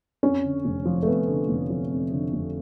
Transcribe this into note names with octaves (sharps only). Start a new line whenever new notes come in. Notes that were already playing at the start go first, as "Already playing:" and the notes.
F2 C#4
D3
F1
F3
A3
F2 B3
D3
F1
F3
F2
D3
F1